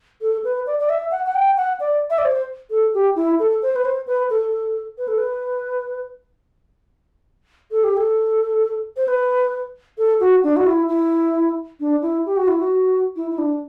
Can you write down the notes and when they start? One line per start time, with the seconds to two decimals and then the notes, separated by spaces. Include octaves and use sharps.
0.22 A4
0.44 B4
0.67 D5
0.79 D5
0.89 E5
1.11 F#5
1.26 F#5
1.35 G5
1.57 F#5
1.80 D5
2.10 E5
2.18 D5
2.25 C5
2.70 A4
2.94 G4
3.16 E4
3.39 A4
3.62 C5
3.75 B4
3.85 C5
4.07 B4
4.30 A4
4.98 B4
5.08 A4
5.18 B4
7.71 A4
7.84 G4
7.97 A4
8.97 C5
9.08 B4
9.98 A4
10.20 F#4
10.44 D4
10.56 F#4
10.66 E4
10.88 E4
11.80 D4
12.02 E4
12.26 G4
12.37 F#4
12.48 E4
12.59 F#4
13.16 E4
13.31 E4
13.38 D4